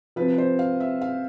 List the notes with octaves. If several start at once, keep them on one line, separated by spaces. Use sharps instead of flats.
C3 F3 B4
C5
F5
E5
F5